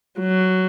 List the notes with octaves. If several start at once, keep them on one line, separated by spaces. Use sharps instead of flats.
F#3